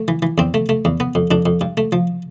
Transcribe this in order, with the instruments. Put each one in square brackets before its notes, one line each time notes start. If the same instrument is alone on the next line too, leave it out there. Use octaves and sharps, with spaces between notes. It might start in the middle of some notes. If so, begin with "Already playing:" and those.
Already playing: [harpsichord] A3
E3
E3
E2 C4
A3
A3
E2
B3
F2
F2 D4
F2
G2
A3
F3